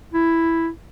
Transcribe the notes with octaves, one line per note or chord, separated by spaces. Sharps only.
E4